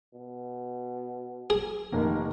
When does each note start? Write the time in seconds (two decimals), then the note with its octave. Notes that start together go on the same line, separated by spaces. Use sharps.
0.14 B2
1.50 G#4
1.92 F1 D#3 A#3